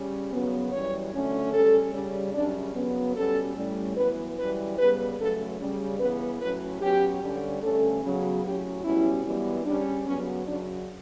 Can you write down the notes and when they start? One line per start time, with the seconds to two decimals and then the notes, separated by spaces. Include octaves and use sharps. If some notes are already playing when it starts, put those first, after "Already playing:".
Already playing: C#3 G3 C#4
0.31 F#2 C#3 F#3 B3
0.72 F#2 E3 G3 C#5
1.12 F#2 D3 A3 C#4
1.53 C#3 G3 C#4 A4
1.94 C#3 G3 C#4
2.34 F#2 C#3 G3 C#4 D4
2.75 F#2 C#3 F#3 B3
3.16 B2 G3 C#4 A4
3.56 A2 G3 C#4
3.97 F#2 E3 B3 B4
4.38 F#2 E3 G3 B4
4.78 C#3 G3 B3 B4
5.19 F#2 C#3 F#3 A3 C#4 A4
5.59 C#3 G3 C#4
6.00 C#3 E3 B3 B4
6.41 A2 F#3 C#4 B4
6.82 B2 F#3 C#4 G4
7.21 G2 D3 G3 C#4
7.63 G2 D3 A3 C#4 A4
8.03 C#3 F#3 B3
8.44 A2 F#3 C#4 G4
8.84 B2 G3 C#4 E4
9.25 F#2 E3 G3 B3
9.65 C#3 G3 C#4 D4
10.06 F#2 C#3 F#3 B3 C#4
10.47 F#2 C#3 F#3 D4